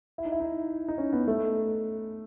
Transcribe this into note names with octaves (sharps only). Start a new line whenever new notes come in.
E4
D#4
E4
D#4
D#4
C#4
B3
A3